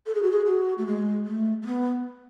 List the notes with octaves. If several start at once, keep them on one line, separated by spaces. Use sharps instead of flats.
A4
G#4
F#4
G#4
F#4
A3
G#3
A3
A3
B3